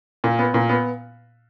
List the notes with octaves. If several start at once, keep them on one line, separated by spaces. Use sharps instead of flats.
A#2
B3
A#2
B3